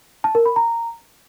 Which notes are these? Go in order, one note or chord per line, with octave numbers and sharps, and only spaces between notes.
A5
A#4
B5
A#5